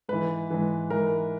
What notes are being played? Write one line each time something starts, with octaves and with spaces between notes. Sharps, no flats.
G#2 E3 B4
G#2 E3
G#2 E3 A#4